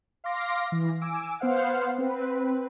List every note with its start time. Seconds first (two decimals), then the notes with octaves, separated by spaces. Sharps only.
0.24 F5 C6 D6 A#6
0.72 E3
1.01 G#5 D6 E6 D7
1.40 B3 C5 F5 F#5
1.98 C4 B4